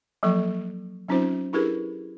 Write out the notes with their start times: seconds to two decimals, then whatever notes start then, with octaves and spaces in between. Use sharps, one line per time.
0.23 F3 F#3 A#3 A4 C#6
1.09 F#3 C4 C#4 D#4 F4 C5
1.53 D4 E4 G4 G#4 A#4 B4